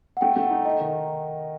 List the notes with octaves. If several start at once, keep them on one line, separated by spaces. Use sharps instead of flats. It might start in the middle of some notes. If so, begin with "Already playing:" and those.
F#5
A3 G5
A3
F#5
D#4
D#4 D#5
D#3